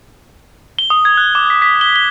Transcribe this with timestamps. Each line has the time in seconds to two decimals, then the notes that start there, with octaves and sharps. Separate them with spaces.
0.79 G7
0.90 D#6
1.05 G#6
1.17 F#6
1.35 D6
1.50 B6
1.62 B6
1.81 G7
1.96 G7